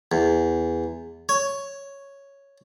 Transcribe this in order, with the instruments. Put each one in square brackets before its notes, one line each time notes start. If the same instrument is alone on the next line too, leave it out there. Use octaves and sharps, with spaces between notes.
[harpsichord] E2
C#5